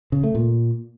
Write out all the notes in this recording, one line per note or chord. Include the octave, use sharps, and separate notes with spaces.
C#3
A3
A#2